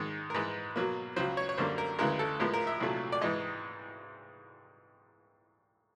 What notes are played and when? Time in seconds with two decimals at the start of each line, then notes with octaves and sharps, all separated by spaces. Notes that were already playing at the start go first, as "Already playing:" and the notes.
Already playing: G#2 D#3 G#3
0.30 A#4
0.34 G#2 E3 G#3 B4
0.76 B2 F#3 A#3
1.16 C#2 C#3 F#3 C5
1.37 C#5
1.49 C#5
1.58 F#2 D3 G3 A#3 C5
1.78 A#4
1.99 D2 C#3 E3 G#3 A#4
2.19 A4
2.40 A2 F3 G#3 B3 A#4
2.53 A#4
2.67 E5
2.80 C2 A#2 F#3 A3
3.12 D5
3.21 G#2 E3 G#3 D#5